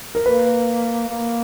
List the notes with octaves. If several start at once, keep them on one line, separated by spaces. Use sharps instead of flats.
A#4
A#3 B4
A#3